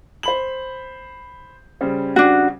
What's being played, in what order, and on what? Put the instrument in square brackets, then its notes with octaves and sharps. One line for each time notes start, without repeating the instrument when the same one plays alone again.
[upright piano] C5 B5 F#7
C#3 G3 C5
[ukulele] D4 F#4